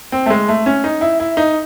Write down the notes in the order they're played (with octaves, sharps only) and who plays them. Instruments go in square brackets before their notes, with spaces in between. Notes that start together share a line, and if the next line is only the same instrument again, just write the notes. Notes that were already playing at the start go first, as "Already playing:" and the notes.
[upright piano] C4
A3
G#3
A3
C#4
D#4
E4
E4
D#4